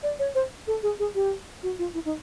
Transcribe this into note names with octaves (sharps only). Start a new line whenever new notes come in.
D5
C#5
C5
A4
G#4
G#4
G4
F#4
F4
E4
D#4